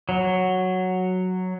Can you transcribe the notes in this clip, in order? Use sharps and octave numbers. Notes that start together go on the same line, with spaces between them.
F#3